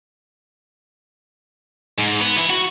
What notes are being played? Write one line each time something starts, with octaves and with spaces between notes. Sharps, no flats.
G#2
B3
E3 E4
F#4